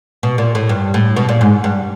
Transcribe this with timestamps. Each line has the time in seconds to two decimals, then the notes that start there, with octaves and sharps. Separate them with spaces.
0.23 B2
0.38 A#2
0.55 A2
0.69 G2
0.94 A2
1.16 B2
1.29 A#2
1.41 G#2
1.64 G2